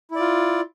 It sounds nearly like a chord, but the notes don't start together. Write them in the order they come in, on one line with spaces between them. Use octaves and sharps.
E4 D5 F4